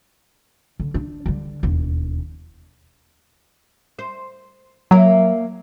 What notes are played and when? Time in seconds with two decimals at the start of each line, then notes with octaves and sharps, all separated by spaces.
0.80 D3
0.94 D4
1.26 D3 G3
1.63 E1 D#2
3.99 C5
4.91 F#3 A#3 E4